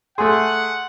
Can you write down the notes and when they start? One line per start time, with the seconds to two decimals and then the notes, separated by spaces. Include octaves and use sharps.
0.18 A3 G#4 F#5 C6